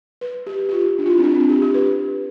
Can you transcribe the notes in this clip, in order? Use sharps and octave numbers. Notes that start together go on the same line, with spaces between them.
B4
G4
G4
F4
D4
F4
E4
C4
D4
D4
G4
G4
B4